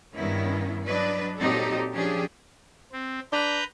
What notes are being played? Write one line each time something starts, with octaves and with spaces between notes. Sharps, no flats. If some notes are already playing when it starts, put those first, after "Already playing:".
G2 D#3 B3 C#4 E4
F#3 D4 B4 D5 D#5
A#2 F#3 C4 D#4 G4 A4
F3 C#4 D4 G4 G#4
C4
D4 B4 A#5 G6